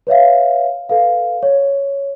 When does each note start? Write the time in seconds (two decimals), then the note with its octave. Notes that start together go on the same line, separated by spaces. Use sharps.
0.07 B4 C#5 E5 F5
0.89 A4 B4 F5
1.43 C#5